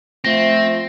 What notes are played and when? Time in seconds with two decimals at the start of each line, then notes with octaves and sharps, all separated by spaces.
0.25 F3 A3 C4 A#6